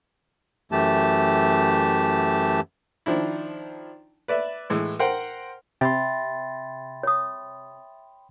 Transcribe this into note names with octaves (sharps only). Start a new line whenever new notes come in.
F#2 E3 A3 G4 A5
D#3 F3 D4 E4
B4 D5 E5
A2 E3 G#3
A#4 C5 F#5 G5
C3 E5 G5 B5 C6 A6
C#5 D#6